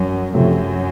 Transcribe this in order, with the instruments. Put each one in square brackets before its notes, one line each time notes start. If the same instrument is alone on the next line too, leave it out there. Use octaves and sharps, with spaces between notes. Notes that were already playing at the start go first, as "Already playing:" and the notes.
Already playing: [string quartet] F#2
[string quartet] F#2 [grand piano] C3 F3 A3